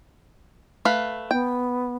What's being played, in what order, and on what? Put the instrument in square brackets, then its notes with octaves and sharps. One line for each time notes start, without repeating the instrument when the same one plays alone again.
[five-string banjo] A3 B4 F5
[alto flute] B3 [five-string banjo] G5